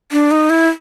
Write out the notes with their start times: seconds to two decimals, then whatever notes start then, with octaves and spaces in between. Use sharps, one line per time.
0.12 D4
0.31 D#4
0.50 E4